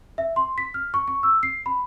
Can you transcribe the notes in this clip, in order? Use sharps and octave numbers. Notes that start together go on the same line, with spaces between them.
E5
C6
B6
F6
C#6
C#6
E6
C7
B5